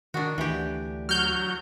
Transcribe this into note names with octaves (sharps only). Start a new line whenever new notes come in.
D#3 D4 F#4
D2 E3 G4
F#3 F6 G6